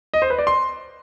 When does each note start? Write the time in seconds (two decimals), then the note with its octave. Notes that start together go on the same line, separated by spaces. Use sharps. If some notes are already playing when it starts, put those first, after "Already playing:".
0.14 D#5
0.22 C5
0.30 B4
0.39 D5
0.47 C6